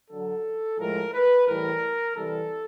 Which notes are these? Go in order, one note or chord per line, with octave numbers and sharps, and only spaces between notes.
D3 F#3 A4
A2 F3 G#3 A#4
B4
A2 E3 G3 A#4
C3 E3 G3 A4